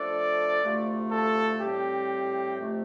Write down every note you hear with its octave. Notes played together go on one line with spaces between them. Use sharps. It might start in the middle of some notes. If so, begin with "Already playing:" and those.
Already playing: F3 A3 D4 A4 D5
D2 C3 A3 F4
A4
A2 G3 C4 G4
F2 C3 A3